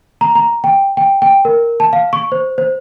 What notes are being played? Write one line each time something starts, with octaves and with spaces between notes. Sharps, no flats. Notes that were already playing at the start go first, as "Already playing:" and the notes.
A#5
A#5
G5
G5
G5
A#4
A5
F5
C#6
C5
C5